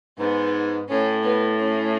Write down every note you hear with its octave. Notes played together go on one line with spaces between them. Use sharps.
G#2 B3
A2 C#4
B3
C#4